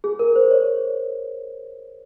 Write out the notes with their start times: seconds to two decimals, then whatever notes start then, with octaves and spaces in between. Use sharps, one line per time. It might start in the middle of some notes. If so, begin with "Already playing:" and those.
0.04 G#4
0.19 A#4
0.36 C5
0.51 C#5